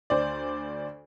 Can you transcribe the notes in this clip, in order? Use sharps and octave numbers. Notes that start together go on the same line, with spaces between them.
D2 C5 D5